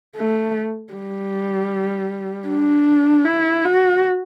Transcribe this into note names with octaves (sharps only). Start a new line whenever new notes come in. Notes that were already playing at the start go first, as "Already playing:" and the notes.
A3
G3
D4
E4
F#4